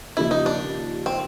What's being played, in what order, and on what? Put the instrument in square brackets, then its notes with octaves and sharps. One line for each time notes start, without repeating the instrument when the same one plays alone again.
[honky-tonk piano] D#2 C#3 F3 A#3 [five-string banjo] E4
[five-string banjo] D#4
D4
C4